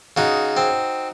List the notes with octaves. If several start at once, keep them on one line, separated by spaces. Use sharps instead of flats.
C#3 D#4 F#4
C4